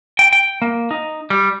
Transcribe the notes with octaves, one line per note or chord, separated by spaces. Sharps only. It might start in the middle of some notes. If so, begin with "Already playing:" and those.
G5
G5
A#3
D#4
G3